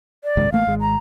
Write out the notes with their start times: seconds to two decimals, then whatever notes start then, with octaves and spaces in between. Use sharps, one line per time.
0.24 D5
0.37 D#1 C#2 G#2
0.52 A1 A3 A#3 F5
0.67 G#1 G#3
0.81 A#5